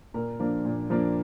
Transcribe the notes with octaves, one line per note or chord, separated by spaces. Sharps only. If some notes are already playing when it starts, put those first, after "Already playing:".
A#2 A#4
F3 A#3 D4
A#2
F3 A#3 D4